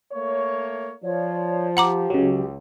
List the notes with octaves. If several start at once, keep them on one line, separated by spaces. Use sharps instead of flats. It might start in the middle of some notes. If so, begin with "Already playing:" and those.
A3 A#3 C#5
F3 C#5 D5
G4 F#5 A#5 D6
C#2 C#3 F#3